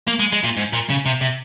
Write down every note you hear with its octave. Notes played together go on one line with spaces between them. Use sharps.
A#3
G#3
G#3
A#2
G#2
A#2
C#3
C3
C3